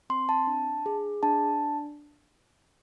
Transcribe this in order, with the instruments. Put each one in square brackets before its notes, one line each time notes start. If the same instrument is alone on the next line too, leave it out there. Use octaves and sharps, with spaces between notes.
[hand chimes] C4 C6
A5
D4
G#4
D4 A5